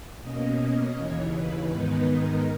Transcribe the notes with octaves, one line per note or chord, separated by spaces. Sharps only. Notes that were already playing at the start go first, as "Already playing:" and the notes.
B2 A#3 C#4 D#5
D#2 C#3 E3 C#5
B4
G#2 D#3 G#3 B3 D#4
A#4